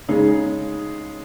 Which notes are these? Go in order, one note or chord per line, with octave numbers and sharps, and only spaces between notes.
C#3 G#3 D#4 G#4